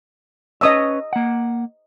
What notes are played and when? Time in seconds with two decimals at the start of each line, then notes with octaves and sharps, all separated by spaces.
0.61 C#4 B4 C#5 D#5 D#6 E6
1.13 A#3 F#5